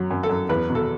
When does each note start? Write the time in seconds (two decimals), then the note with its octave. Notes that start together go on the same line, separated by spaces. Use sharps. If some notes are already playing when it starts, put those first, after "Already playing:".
Already playing: F#2 F#3
0.11 F#2
0.23 A4
0.29 F#2
0.49 E2 B4
0.70 B2
0.75 A4